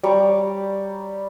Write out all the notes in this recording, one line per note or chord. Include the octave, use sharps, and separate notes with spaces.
G3 A#5 C#6 D6